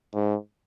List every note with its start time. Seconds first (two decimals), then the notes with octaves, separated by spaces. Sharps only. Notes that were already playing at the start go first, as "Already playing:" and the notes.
0.14 G#2